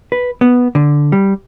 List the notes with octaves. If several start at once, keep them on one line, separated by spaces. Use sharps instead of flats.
B4
B3
D3
G3